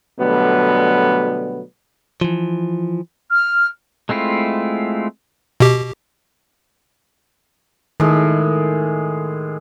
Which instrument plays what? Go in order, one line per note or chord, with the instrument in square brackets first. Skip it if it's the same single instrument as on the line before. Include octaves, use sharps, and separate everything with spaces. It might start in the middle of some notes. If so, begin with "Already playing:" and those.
[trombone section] B2 D3 F#3 G3 A3 B3
[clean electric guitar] E3 F3
[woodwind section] F6
[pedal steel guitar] G#3 A3 C4 E4 F4
[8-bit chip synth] B2 G4
[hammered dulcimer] A2 G#3 [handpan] D#3